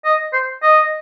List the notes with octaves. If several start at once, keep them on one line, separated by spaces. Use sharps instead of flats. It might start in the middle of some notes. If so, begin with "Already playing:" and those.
D#5
C5
D#5